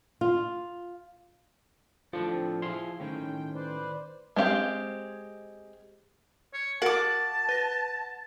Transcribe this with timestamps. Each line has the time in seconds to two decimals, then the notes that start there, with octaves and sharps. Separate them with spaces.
0.21 F4
2.13 A2 F3 D4 A4
2.26 C4
2.62 F3 E4 G#4 F5 C6
3.00 A2 D#3 C#4 G5
3.54 B4 C5 D5
4.36 G#3 C4 G4 F5
6.54 C#5
6.82 F#4 A#4 F5 F#5 A5 D6
7.49 B4 A#6